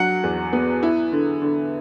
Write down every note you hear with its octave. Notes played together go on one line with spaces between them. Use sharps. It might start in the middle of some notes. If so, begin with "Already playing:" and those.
Already playing: F#3 D4 F#5
E2
B3
E4
D3
D3